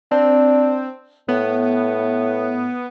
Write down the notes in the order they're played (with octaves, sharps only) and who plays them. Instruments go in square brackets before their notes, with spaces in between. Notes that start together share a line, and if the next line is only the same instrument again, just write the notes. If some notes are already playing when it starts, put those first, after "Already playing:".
[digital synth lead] C4 [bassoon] D4
[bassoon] A2 [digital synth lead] B3